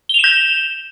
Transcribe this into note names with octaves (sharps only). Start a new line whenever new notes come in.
G6 E7 F7 G7